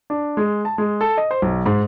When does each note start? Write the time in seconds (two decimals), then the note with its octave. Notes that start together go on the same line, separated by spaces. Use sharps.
0.10 D4
0.37 G#3
0.65 A5
0.78 G#3
1.01 A4
1.17 D#5
1.31 C5
1.42 B1
1.66 G#2